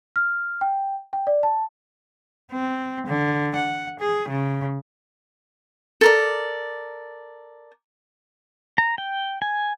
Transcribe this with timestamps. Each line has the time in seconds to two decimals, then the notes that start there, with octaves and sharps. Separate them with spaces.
0.16 F6
0.61 G5
1.13 G5
1.27 D5
1.43 A5
2.52 C4
3.07 D3
3.56 F#5
4.00 G#4
4.28 C#3
6.01 A4 A#4 D5
8.78 A#5
8.98 G5
9.42 G#5